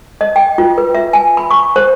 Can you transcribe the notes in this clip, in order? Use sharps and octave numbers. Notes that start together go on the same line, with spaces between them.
D#5
G5
F4
B4
E5
G#5
B5
C#6
C5